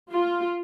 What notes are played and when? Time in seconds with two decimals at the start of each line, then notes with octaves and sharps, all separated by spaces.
0.11 F4